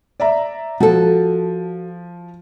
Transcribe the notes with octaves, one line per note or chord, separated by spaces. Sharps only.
D5 E5 A#5
F3 F#4 A4